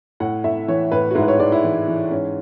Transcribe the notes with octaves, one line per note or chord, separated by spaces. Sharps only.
A2 F#5
A2 E5
E3 C#5
A2 B4
F#4
G#2 E4
B4
C#5
G#2 D5
E4
E3
E3
G#2 C#4